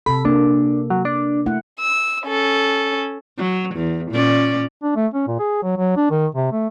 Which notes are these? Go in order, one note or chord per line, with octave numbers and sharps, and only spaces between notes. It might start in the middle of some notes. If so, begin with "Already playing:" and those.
C3 A4 B5
A#3 D4
F#3
D4
A3 E4 F#5
E6
C#4 A4
F#3
E2
A#2 C#4 D5
D4
A3
C#4
A#2
G#4
F#3
F#3
D4
D#3
C3
A3